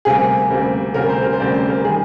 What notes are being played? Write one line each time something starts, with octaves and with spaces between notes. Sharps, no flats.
D2 C3 G3 A#3 G#4
D2 C3 G3 A#3
D2 C3 G3 A#3 A#4
C5
A#4
C5
D2 C3 G3 A#3 D5
C5
A#4
D#3 G3 G#4